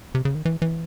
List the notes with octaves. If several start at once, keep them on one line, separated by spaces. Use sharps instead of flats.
C3
C#3
D#3
E3
E3